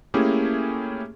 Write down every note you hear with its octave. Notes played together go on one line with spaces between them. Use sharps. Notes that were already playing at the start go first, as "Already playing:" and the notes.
A3 A#3 C#4 E4 G4 G#4